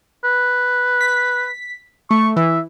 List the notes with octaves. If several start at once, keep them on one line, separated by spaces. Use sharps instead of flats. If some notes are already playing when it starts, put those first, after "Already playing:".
B4
B6
A3 C#6
E3 E5